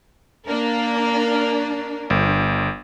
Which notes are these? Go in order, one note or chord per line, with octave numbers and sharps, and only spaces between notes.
A#3 D4 A#4
G1